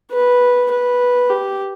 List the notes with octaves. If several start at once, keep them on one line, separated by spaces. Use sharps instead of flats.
B4
B4
G4